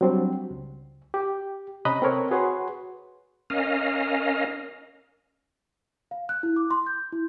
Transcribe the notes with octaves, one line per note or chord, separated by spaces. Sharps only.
F#3 G3 C4 D4
C#2
G4
C3 C#4 D#5 A#5 B5 F#6
C4 A4 A#4 C#5
F#4 G#4 B4 C#5 F#5 C6
C#4 A#4 D#5 F5
F5
F#6
E4
D6
C6
G6
E4